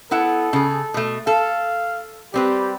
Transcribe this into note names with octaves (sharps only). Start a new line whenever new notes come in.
B3 E4 A4 F#5
C#3 G#4
B2 A3
A4 F5
G3 C4 G4 B4